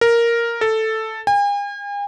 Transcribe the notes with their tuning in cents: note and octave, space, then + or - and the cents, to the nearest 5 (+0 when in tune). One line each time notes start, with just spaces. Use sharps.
A#4 +0
A4 +0
G#5 -45